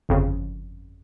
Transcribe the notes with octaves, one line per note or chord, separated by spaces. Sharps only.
G1 F2 C#3